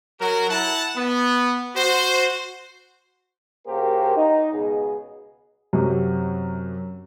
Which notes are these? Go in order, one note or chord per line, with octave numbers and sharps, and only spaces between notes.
F#3 F#4 A#4
E4 F#5 A5
B3
F#4 C5
C#3 A#3 F#4 G4 A#4 C5
D#4
C#2 B2 G#4
F#2 C3 F#3